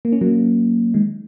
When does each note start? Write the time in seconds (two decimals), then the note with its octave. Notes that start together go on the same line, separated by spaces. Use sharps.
0.05 A#3
0.12 C#4
0.21 F#3 A#3
0.94 D#3 G#3